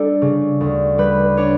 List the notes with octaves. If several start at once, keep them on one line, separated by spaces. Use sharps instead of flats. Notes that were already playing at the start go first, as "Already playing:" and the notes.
Already playing: G3 D4 A4
C#3
D2
G3 B4
D4 C#5